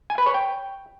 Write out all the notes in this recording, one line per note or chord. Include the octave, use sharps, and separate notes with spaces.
G#5
B4
C#5
G5